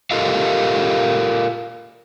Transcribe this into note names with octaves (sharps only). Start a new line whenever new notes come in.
F4 G4 A4 A#4 D#5 F5